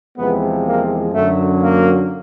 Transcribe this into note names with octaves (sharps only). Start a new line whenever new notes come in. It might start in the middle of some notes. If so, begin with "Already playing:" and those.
E2 C3 F3 G#3 B3
A#3
F#2 D3 F#3 A3
A#3